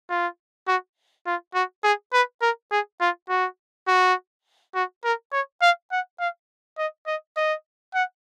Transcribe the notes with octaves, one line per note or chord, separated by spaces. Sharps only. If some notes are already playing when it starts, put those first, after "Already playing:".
F4
F#4
F4
F#4
G#4
B4
A#4
G#4
F4
F#4
F#4
F#4
A#4
C#5
F5
F#5
F5
D#5
D#5
D#5
F#5